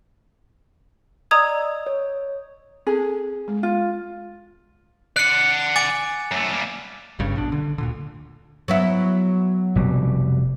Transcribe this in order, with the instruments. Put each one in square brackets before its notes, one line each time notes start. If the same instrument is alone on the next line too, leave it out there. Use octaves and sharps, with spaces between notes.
[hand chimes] D5 D#5 E6 [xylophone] A#5 D#6 G#6
[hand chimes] C#5
[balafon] C4 A4 [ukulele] G#4
[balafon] G#3
[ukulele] F4
[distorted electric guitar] D5 F#5 [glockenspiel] F#6 C#7
[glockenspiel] G#5 D6 A6
[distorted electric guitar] F#2 A3
G3 A#3
[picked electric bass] G1 G2 C#3
A#1 B2 D4
D3
D2 A#2 D3
[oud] F#3 B3 E4
[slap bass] F1 B2 G3